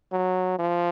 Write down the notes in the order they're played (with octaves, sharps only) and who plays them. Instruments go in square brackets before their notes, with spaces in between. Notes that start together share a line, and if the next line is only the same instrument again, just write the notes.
[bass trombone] F#3
F3